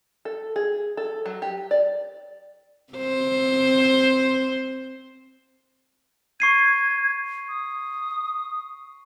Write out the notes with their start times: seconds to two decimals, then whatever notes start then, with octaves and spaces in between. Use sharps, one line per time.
0.25 A4
0.56 G#4
0.97 A4
1.26 F#3
1.42 G4
1.71 D5
2.93 C4 C5
6.40 C#6 G#6 C7 D#7
7.49 D#6